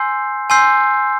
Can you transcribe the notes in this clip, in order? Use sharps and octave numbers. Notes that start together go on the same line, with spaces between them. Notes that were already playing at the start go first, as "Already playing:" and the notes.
Already playing: G#5 C6 E6 G6 C7
G#5 C6 E6 G6 C7